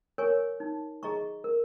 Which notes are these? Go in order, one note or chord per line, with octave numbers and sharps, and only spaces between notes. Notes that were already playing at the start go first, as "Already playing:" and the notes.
A#4 C#5 G#5 C#6
D#4
G#4 D#5 A#5 C#6
A#4